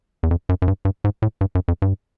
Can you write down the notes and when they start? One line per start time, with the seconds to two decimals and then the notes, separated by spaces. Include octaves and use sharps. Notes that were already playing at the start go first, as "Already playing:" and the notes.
0.23 E2
0.31 F2
0.49 F#2
0.62 F#2
0.68 G2
0.85 G2
1.04 G#2
1.22 A2
1.41 G2
1.55 F#2
1.68 F2
1.82 G2